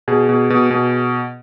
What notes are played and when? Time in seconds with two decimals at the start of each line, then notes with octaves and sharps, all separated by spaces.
0.08 B2 G#4
0.29 B2
0.50 B2
0.70 B2